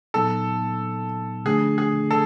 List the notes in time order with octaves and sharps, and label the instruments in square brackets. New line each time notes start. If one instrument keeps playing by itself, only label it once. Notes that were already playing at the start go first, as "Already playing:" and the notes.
[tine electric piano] A#2 F#3 B3 D#4 [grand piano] A4
[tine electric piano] D3 F3 A3 D4 [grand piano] G#4
[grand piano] G#4
A4